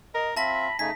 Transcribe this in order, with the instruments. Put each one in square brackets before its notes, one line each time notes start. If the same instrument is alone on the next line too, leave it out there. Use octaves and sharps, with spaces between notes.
[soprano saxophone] A#4 [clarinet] D#5
[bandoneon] C4 F4 [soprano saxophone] E5 [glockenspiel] A5 A#6 [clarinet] B5
[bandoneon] C#3 A3 D#4 [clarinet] G#5 [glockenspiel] B6